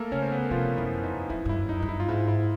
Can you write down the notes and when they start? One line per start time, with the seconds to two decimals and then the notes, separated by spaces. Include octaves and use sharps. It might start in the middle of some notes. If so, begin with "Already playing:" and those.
Already playing: A3 A#3 A4 A#4
0.12 C#3 C#4 C#5
0.22 C5
0.32 B3 B4
0.51 C3 F3 F4
0.78 F#2 E4
1.03 F2 D#4
1.29 F2 E4
1.45 G2 E4
1.56 F#2
1.69 D#4
1.80 G2 D#4
1.89 E4
2.00 F4
2.08 G#2 E4
2.28 E4